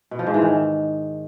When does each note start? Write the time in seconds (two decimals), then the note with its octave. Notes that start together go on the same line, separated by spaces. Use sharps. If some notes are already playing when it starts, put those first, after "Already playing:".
0.11 B2
0.19 F3
0.27 G#2
0.34 E3
0.42 D#3